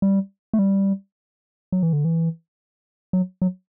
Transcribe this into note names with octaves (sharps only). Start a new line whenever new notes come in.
G3
A3
G3
F#3
E3
D3
E3
F#3
F#3